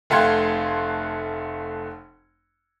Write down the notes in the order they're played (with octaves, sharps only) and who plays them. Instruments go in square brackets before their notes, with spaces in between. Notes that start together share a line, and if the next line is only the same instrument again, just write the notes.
[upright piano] F1 A3 F5 F#5 C6 G#6